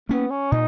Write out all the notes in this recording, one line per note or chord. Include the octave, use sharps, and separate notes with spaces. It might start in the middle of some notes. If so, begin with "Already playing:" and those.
A#3 B3 C#4
C#4
A#2 D#4